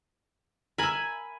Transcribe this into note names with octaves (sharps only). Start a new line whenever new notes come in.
A#4 E5 G#5 B5